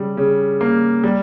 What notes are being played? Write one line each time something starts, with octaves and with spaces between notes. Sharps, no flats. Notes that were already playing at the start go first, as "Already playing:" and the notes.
Already playing: C#3 G3
C#3
A#3
G3